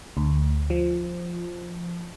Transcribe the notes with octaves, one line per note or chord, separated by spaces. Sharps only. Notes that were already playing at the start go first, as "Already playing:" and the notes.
D2
F3